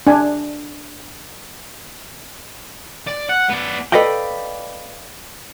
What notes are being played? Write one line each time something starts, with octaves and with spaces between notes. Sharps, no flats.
D4 G#5
D5
F#5
B3 D5
A4 B4 D5 D#5 F5 G5